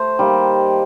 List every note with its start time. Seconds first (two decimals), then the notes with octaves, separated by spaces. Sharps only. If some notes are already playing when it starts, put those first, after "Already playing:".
Already playing: A3 C5
0.19 D#3 G3 A#3